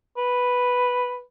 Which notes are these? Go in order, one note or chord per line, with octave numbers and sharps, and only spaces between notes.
B4